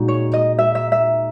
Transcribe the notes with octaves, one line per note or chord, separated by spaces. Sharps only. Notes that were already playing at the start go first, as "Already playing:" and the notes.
Already playing: A#2 G#3 D#4 F#4
C#5
D#5
E5
E5
E5